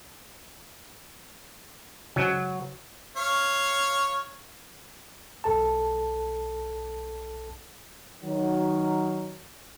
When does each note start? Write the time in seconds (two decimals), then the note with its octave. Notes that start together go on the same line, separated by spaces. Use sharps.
2.16 C#3 F#3
3.17 C#5 F5
5.44 B1 A4 A5
8.23 D#3 F#3